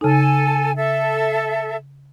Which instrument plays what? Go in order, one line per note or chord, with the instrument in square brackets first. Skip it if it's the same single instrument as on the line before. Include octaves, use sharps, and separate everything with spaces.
[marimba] C#3 D#4 [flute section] A4 G#5
[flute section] A4 E5